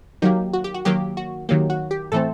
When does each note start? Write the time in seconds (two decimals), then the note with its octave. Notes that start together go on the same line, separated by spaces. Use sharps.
0.22 D#3 F#3 A#3 G4
0.53 F#4
0.64 G4
0.74 F#4
0.85 D#3 F#3 A#3 G4
1.17 F#4
1.49 D#3 F#3 A#3 G4
1.70 F#4
1.91 G4
2.12 A2 E3 A3 C4 A4